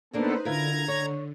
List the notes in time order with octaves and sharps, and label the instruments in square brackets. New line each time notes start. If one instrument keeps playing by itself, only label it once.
[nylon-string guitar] D2 A#3 D4 [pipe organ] B3 A4 [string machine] D#4 B4 C5
[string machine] D3 [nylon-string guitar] E4 F4 A#4 [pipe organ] A#5 G#6
[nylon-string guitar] C#5